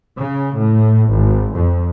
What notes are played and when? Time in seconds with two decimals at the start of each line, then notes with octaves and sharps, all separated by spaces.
0.19 C#3
0.59 A2
1.14 G#1
1.57 F2